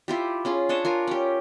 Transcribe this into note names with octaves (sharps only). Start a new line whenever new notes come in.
E4 F4 G4
C#4 F4 G#4
D4 C#5 D#5 A5
F4 A#4 G#5
C#4 G4